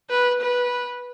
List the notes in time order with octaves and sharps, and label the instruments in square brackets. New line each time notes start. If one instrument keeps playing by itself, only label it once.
[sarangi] B4
B4